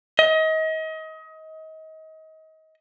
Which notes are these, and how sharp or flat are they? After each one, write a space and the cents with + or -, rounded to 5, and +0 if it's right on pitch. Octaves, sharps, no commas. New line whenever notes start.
D#5 +30